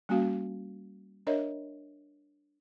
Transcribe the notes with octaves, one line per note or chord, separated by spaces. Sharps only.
G3 A#3 C#4 F#4 F5
D4 A#4 C#5 D#5 E5